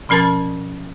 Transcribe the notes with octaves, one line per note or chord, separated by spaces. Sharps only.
B2 F3 C#4 A#4 A5 A6